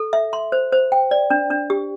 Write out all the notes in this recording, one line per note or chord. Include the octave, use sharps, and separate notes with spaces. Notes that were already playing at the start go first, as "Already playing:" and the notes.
Already playing: A4
E5
C6
C5
C5
G5
D5
D4
D4
G4